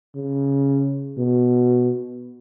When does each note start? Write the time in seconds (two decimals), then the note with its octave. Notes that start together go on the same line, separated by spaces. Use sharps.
0.15 C#3
1.18 B2